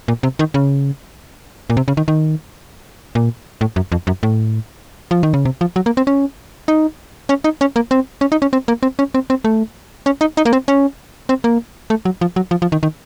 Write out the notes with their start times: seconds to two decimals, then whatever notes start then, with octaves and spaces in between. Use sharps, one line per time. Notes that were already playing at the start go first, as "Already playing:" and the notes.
0.08 A#2
0.23 C3
0.39 D#3
0.54 C#3
1.70 A#2
1.77 C3
1.88 C#3
1.97 D#3
2.08 D#3
3.15 A#2
3.61 A2
3.76 F#2
3.92 F2
4.07 F#2
4.23 A2
5.11 F3
5.23 D#3
5.34 C#3
5.45 C3
5.61 F3
5.76 F#3
5.86 A#3
5.97 C4
6.07 C#4
6.68 D#4
7.29 C#4
7.44 D#4
7.61 C#4
7.76 A#3
7.91 C4
8.21 C#4
8.32 D#4
8.42 C#4
8.53 C4
8.68 A#3
8.83 C4
8.99 C#4
9.14 C4
9.30 C4
9.44 A3
10.06 C#4
10.21 D#4
10.37 D#4
10.45 A#3
10.53 C4
10.68 C#4
11.29 C4
11.44 A#3
11.90 A3
12.05 F#3
12.21 F3
12.36 F#3
12.51 F3
12.62 F3
12.72 D#3
12.83 D#3